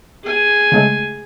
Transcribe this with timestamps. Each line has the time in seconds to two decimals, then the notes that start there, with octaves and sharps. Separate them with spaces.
0.23 G#4 G#5
0.72 C#3 G#3 A3